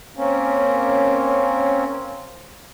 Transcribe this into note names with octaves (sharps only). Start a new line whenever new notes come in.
A#3 C4 C#4